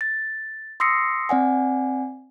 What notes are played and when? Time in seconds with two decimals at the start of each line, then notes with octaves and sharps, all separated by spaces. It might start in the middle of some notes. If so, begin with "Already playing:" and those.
0.01 A6
0.80 C6 D#6 E6 A#6 C7 C#7
1.29 C4 D5 F#5 G#5